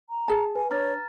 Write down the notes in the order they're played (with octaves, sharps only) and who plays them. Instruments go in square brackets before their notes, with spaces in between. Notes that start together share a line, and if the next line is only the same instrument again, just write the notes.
[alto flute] A#5
[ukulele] G#4 A5
[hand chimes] B4 [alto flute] G#5
[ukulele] D4 [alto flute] C#5 [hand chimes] A#5 F6 A6